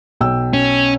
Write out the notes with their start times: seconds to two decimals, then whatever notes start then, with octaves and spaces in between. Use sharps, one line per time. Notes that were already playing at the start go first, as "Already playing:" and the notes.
0.21 B1 G5 E6
0.54 C#4